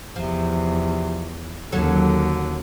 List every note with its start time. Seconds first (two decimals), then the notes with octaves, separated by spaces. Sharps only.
0.16 E2 C3 F3
1.72 D#2 D3 F#3 C#4 A4